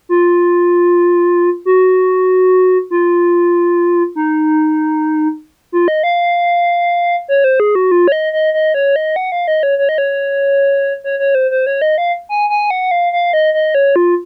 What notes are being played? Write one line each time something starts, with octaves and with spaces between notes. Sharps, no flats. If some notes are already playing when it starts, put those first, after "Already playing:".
F4
F#4
F4
D#4
F4
D#5
F5
C#5
C5
G#4
F#4
F4
C#5
D#5
D#5
D#5
C#5
D#5
F#5
F5
D#5
C#5
C#5
D#5
C#5
C#5
C#5
C5
C5
C#5
D#5
F5
G#5
G#5
F#5
F5
F5
D#5
D#5
C#5
F4